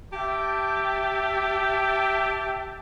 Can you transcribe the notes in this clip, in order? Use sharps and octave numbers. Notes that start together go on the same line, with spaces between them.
G4 E5 G5 A5